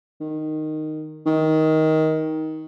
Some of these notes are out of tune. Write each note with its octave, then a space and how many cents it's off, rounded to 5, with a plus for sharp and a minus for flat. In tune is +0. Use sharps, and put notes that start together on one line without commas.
D#3 -10
D#3 +15